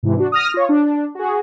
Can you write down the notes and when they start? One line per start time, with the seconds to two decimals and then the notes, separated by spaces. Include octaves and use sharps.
0.03 G#2 C3 E3
0.17 D4 F#4
0.32 D#6 F6 A#6
0.54 F4 C#5
0.69 D4
1.15 F#4 G#4